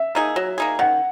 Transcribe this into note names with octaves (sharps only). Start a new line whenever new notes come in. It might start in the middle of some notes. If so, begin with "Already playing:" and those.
Already playing: E5
A#3 D#4 G#4
F#3
A#3 D#4 G#4
D#3 F#5